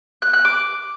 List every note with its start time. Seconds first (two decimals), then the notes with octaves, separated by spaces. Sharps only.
0.22 F#6
0.33 F#6
0.45 D6